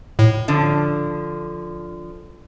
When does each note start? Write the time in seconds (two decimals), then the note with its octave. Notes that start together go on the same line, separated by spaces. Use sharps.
0.19 A2
0.48 D3 F3